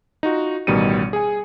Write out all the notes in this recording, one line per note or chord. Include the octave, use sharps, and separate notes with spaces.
D#4 F4 F#4
A1 B2 D#3 G3 C#7 D#7
G#4 G#5